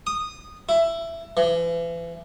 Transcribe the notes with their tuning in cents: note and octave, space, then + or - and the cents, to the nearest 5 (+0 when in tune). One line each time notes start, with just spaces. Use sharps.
D#6 -10
E4 +15
E3 +35